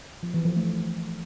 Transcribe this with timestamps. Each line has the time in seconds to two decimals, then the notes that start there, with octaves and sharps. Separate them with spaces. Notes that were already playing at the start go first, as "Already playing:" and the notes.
0.23 F3
0.34 E3
0.45 F3
0.57 A3